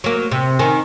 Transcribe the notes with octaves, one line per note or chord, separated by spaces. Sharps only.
F#3 A#3
C3
D#3 C#4